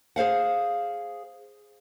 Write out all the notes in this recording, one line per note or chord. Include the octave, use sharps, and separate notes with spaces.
G#4 C5 F5 F#5